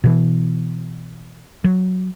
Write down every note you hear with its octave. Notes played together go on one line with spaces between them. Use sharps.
B2 E3
F#3